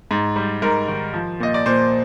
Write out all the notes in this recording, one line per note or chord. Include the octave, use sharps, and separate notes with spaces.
G#2
G3
G#2 A#4
D#3
F3
A#2 D#5
D5
A#2 C5